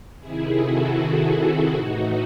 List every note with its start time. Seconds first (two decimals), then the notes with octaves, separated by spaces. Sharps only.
0.20 C3 D#3 E4 G#4
0.58 F#4 A4
0.97 E4 G#4
1.35 E4 G#4
1.73 A2 E3 D#4 F#4